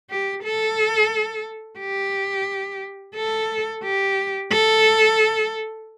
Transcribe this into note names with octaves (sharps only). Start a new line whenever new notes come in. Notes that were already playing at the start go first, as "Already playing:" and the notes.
G4
A4
G4
A4
G4
A4